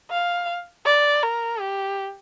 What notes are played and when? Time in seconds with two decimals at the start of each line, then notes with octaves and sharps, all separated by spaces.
0.11 F5
0.86 D5
1.23 A#4
1.60 G4